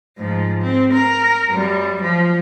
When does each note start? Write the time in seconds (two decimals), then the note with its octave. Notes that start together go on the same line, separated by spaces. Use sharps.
0.18 G#2 F3
0.61 C4
0.93 A#4
1.48 F#2 G3
2.01 F3